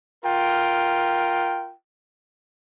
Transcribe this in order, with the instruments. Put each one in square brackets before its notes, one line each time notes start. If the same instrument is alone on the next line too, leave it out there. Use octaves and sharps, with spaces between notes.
[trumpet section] F4 A#4 G5